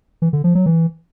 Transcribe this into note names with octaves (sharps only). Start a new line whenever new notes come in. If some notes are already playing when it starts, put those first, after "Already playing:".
E3
D3
F3
F#3
E3